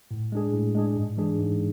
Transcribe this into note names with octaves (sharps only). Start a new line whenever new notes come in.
A2
G#3 D4 G#4
A2
G#3 D4 G#4
G#2
E3 G#3 D4 G#4
G#2